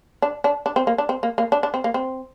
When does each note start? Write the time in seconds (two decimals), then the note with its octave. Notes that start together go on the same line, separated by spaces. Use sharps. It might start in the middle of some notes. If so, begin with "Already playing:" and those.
0.22 D4
0.44 D4
0.66 D4
0.76 C4
0.87 A#3
0.98 D4
1.09 C4
1.23 A#3
1.38 A#3
1.52 D4
1.63 D4
1.74 C4
1.84 A#3
1.94 C4